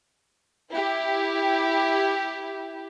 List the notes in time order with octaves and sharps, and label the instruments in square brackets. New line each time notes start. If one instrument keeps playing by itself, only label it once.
[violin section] E4 G4